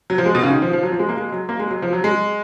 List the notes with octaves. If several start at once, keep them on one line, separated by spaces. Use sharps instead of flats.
F#3
F3
G#3
B2
C#3
D#3
F3
F3
F#3
F3
G#3
A#3
G#3
F#3
A#3
G#3
F#3
F3
F#3
G#3